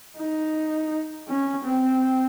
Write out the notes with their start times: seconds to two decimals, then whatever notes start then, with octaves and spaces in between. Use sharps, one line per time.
0.18 D#4
1.28 C#4
1.64 C4